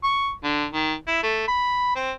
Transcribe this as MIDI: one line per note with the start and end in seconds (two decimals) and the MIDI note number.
0.03 0.31 85
0.44 0.65 50
0.72 0.93 51
1.07 1.21 64
1.23 1.45 57
1.48 1.91 83
1.95 2.11 60